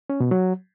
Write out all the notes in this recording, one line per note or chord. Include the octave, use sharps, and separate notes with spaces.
C#4
B2
F#3